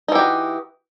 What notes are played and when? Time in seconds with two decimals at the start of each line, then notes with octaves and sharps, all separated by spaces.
0.08 D#4
0.12 E3
0.15 G4
0.19 F#4